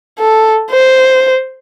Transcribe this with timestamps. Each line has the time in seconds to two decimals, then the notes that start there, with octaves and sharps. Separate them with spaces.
0.19 A4
0.70 C5